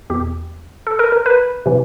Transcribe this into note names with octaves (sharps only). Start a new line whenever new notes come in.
E2 B2 G4
A4
A#4
A#4
B4
C3 E3